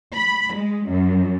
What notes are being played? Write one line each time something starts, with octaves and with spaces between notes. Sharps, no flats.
B5
G#3
F#2